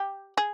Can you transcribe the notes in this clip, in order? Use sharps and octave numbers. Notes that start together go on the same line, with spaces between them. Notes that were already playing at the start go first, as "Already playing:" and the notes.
Already playing: G4
G#4